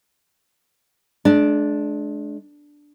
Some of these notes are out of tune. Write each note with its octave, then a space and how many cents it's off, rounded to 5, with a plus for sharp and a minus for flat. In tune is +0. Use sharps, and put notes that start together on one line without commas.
G#3 +40 D4 +0